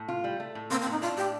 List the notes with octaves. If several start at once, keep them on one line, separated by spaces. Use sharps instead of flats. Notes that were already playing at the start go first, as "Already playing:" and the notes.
Already playing: A2
F4
G3
A3
A2
A#3 C4
C4
A2 D#4
D4 F4
A2 G4